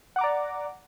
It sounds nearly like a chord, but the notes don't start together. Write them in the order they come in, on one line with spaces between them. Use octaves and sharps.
F#5 D6 A#5 D5